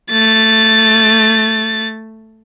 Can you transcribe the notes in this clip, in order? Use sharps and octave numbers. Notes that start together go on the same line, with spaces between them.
A3 A6